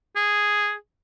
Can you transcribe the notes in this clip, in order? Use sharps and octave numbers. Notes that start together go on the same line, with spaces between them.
G#4